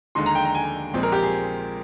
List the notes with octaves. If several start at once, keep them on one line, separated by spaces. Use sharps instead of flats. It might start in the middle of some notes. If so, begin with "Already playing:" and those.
D#2 D3 G#3 D#4 C6
A#5
G5
A#5
G#5
A#1 A#2 G#3 C4
A#4
G4
G#4